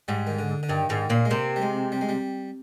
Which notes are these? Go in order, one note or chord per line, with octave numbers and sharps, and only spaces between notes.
G#2 G3
D#3
D3
D3
G2 D#3
G#2 D#3
A#2 A#3
G#3
C3 A#3
G3
G#3
G3
G#3
G3